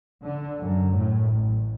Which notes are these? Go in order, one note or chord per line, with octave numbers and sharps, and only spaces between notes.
D3
F#2
A2
A1